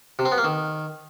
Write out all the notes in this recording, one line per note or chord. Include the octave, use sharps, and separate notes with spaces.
C3
C4
B3
A#3
D#3